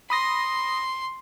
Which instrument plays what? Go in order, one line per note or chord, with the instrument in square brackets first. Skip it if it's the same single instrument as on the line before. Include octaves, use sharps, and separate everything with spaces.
[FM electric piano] B5 D#6 A#6 [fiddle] C6